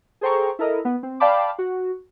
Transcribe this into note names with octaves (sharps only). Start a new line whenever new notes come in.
G#4 A4 C5 G5 A#5 C#6
E4 A4 A#4 D#5
B3
C4
D5 F5 G5 A5 B5 D6
F#4